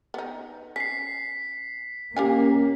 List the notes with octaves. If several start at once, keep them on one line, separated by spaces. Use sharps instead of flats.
B3 D#4
C#4 B6 C7
A#3 C#4 G4 F5 G#5